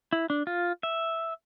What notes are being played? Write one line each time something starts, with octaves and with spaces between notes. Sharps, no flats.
E4
D4
F4
E5